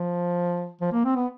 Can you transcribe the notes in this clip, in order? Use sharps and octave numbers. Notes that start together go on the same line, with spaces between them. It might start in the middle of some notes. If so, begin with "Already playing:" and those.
Already playing: F3
F3
A#3
C4
B3